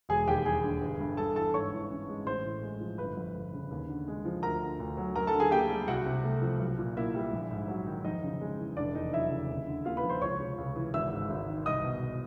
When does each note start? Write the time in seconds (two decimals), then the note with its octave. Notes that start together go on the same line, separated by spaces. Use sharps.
0.09 E1 G#4 G#5
0.27 D#2 G4 G5
0.45 G3 G#4 G#5
0.63 D3
0.82 G1
1.00 G2
1.17 G1 A4 A5
1.36 E3 A4 A5
1.54 G#2 C#5 C#6
1.73 E3
1.90 C#4
2.08 G#3
2.26 A1 C5 C6
2.45 A2
2.63 G#3
2.80 F3
2.98 G1 B4 B5
3.17 F2
3.35 G1
3.53 C#3
3.71 D#2
3.89 D3
4.08 G#3
4.25 F3
4.43 D2 A#4 A#5
4.61 D3
4.80 D2
4.97 F#3
5.16 F#2 A#4 A#5
5.27 A4 A5
5.34 D3
5.40 G#4 G#5
5.51 A#3 G4 G5
5.70 G3
5.88 C2 F#4 F#5
6.06 C3
6.24 A3
6.42 F3
6.60 B1
6.78 A#2
6.97 A#3 E4 E5
7.15 G3
7.33 A#1
7.51 G#2
7.68 F#3
7.87 D#3
8.04 F2 D#4 D#5
8.23 C#3
8.41 G#3
8.59 E3
8.77 F1 D4 D5
8.95 E2 D#4 D#5
9.13 F#3 E4 E5
9.31 C#3
9.50 D#2
9.68 D3
9.85 A#3 F4 F5
9.97 B4 B5
10.03 F3
10.09 C5 C6
10.21 C#2 C#5 C#6
10.39 C3
10.58 C#2
10.76 E3
10.94 G#1 E5 E6
11.12 G#2
11.30 G#1
11.49 D#3
11.66 C2 D#5 D#6
11.84 B2